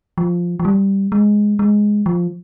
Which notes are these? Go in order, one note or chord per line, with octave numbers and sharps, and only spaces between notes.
F3
F3
G3
G#3
G#3
F3